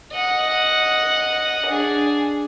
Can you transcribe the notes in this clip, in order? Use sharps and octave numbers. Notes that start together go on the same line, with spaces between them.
D#5 F#5
D4 G#4